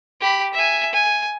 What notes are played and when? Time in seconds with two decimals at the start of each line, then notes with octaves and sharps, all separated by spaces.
0.21 G4 B5
0.54 E5 G#5
0.92 G#5